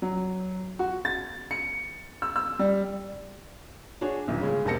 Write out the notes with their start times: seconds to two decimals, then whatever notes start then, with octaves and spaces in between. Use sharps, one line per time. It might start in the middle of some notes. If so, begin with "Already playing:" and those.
0.02 F#3
0.79 F#4
1.05 A6
1.51 C#7
2.22 E6
2.36 E6
2.59 G3
4.01 D4 F#4 G#4 C#5
4.28 D#1 B1 A#2
4.41 C#3 G#3 G#4
4.65 E1 C3 A#3 A5 A#6 C#7